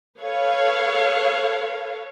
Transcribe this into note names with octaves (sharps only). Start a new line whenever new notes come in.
A4 B4 C#5 F5